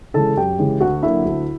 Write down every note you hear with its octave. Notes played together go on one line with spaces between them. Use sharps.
C#3 E3 G#3 A4 A5
F#2 G4 G5
C#3 E3 G#3
D2 F#4 F#5
D3 F#3 A#3 E4 E5
D2